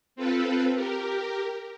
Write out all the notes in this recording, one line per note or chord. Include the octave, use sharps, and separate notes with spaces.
C4 F4 A4 B4
G4 A#4